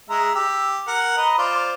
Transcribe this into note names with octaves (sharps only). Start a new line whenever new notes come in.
G#3 E5 A#5
G4 E6
A#4 F#5
B4 D#5 A#5
F4 C5 D5